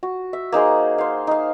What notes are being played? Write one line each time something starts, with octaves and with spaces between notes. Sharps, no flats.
F#4
E5
A#3 D#4 G#4 C5
C5 F5
D#4 F5